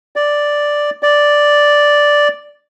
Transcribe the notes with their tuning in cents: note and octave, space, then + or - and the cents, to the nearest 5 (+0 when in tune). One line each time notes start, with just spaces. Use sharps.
D5 +0
D5 +0